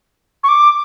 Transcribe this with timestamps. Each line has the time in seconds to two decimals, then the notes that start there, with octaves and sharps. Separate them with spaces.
0.43 C#6
0.48 D6